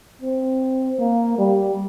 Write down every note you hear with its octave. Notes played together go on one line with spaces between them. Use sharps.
C4
A#3
G3